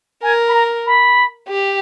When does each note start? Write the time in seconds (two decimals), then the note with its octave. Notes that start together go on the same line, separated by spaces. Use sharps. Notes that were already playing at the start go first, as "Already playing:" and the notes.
0.23 A#4 G#5
0.48 B5
0.54 A#5
0.87 B5
1.49 G4